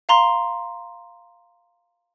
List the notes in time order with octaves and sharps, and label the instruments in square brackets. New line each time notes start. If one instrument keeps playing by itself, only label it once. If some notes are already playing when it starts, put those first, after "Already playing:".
[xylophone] F5 A#5 C6